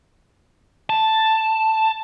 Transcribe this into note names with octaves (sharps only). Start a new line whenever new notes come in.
A5